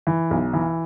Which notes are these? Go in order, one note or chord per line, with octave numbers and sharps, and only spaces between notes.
E3
B1
E3